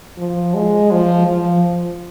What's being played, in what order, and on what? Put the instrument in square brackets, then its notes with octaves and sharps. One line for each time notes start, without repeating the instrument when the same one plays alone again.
[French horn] F3
G#3
F3
F3